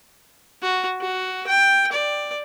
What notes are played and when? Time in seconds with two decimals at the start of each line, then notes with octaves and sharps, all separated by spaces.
0.62 F#4
1.01 F#4
1.47 G5
1.92 D5